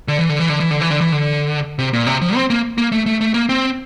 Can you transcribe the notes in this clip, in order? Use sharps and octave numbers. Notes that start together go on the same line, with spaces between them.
D3
E3
D3
E3
D3
E3
D3
E3
D3
E3
D3
C3
A#2
C3
F3
C4
A#3
A#3
A3
A3
A3
A#3
C4